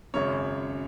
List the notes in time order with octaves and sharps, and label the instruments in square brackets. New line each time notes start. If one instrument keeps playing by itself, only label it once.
[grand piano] G#1 F#2 C#3 C#5